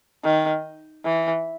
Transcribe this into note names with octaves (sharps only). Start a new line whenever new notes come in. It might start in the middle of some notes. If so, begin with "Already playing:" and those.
D#3
E3